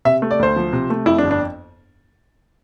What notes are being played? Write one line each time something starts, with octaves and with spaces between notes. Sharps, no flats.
C3 E5
A3
D5
D2 C5
F3
C3
A3
F2 E4
D4
G1
D4